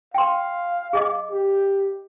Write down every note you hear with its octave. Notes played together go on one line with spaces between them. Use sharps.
F5 G5 C6
G#4 D#5 D6
G4